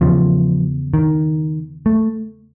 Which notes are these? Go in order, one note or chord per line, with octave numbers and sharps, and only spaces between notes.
E2 C#3 F3
D#3
A3